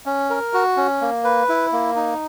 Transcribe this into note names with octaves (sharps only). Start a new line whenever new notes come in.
C#4
A#4
F#4
C#4
A#3
B4
E4
A#3
D#4